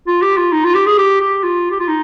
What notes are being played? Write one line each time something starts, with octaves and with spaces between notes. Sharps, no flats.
F4
G4
F4
D#4
F4
G4
G#4
G4
G4
F4
G4
F4
D#4